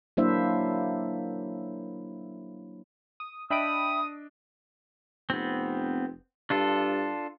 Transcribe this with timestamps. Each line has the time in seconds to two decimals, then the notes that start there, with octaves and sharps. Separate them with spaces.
0.17 F#3 A#3 D4 E4 C5 E5
3.20 D#6
3.50 D4 D#5 E5 G5 B5 D#6 D7
5.30 F1 B3 C4
6.50 G2 D4 F4 A4